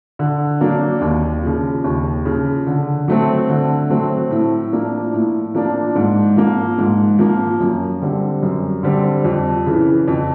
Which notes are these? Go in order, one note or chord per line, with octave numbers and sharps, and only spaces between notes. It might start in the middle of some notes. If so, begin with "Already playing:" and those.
D3
F#3 A#3 D4
D#2
C#3 F3
D#2
C#3 F3
D3
F#3 A3 C4
D3
F#3 A3 C4
A2
F3 A#3 D4
A2
F3 A#3 D4
G#2
F3 A#3
G#2
F3 A#3
F#2
D3 G3 C4
F#2
D3 G3 C4
F2
C#3 E3
F2